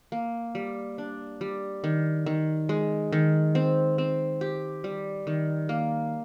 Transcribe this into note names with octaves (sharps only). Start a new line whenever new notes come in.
A#3
G3
D4
G3
D#3
D#3
G#3
D#3
C4
C4
G4
G3
D#3
A#3